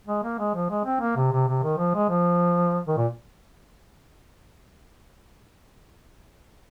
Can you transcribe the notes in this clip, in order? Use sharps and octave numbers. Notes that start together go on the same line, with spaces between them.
G#3
A#3
G#3
F3
G#3
C4
A#3
C3
C3
C3
D#3
F3
G#3
F3
D#3
A#2